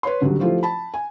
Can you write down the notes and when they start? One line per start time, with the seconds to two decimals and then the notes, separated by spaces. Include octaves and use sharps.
0.03 B4 C#5 C6
0.21 A1 D2 D3 F#3 G3
0.40 F3 A3 E4 F4 G4 C5
0.63 A5 B5
0.94 G#5